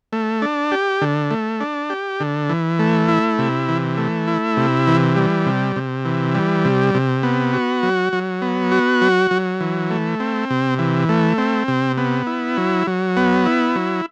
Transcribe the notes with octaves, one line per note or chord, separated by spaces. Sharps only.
A3
D4
G4
D3
A3
D4
G4
D3
E3
A3
E4
C3
E3
A3
E4
C3
E3
G3
C3
C3
E3
G3
C3
C3
B3
F#4
F#3
F#3
B3
F#4
F#3
F#3
E3
A3
C4
C3
E3
A3
C4
C3
B3
E4
F#3
F#3
B3
E4
F#3